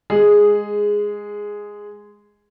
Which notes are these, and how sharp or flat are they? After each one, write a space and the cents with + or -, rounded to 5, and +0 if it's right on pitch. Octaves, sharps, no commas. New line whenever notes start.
G#3 -5 G#4 +0